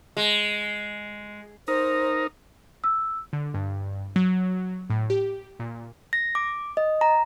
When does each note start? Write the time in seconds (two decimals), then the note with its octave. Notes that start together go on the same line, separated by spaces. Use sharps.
0.17 G#3
1.68 D#4 A#4 C5
2.84 E6
3.33 D3
3.54 G2
4.16 F#3
4.90 A2
5.10 G4
5.60 A#2
6.13 A#6
6.35 D6
6.77 D#5
7.01 A#5